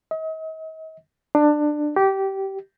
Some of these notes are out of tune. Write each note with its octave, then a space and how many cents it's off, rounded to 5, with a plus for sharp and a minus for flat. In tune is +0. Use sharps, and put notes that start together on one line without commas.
D#5 +40
D4 +20
G4 -20